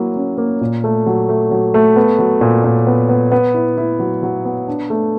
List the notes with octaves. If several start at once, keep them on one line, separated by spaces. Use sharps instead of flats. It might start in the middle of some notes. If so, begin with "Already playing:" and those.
Already playing: F#3 A#3 E4
C#4
A#3
A#2
A3
F#3
A3
F#3
A3
B3
F#3
A#2
A#2
B3
B3
B3
E4
E4
F#3
F#3
B3
D4
A3